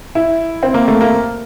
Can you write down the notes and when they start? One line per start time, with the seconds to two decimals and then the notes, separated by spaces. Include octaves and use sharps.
0.15 E4
0.63 C4
0.74 A#3
0.88 A3
1.01 A#3